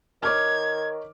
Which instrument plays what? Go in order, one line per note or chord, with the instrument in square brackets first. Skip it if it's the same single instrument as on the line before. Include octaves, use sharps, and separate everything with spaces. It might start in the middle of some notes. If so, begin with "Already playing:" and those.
[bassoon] D#3 [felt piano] C#5 D6 F6 [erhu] G#6